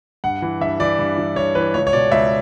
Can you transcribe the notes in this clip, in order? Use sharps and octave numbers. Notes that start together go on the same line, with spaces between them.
G2 F#5
E3
G2 E5
E3 D5
G2
E3
G2 C#5
E3 B4
C#2 C#5
C#5
B2 D5
C#2 E5